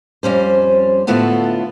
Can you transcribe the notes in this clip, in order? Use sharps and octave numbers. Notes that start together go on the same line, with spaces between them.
F2 G3 C#4 C5
A2 D3 A3 B3 E4 F4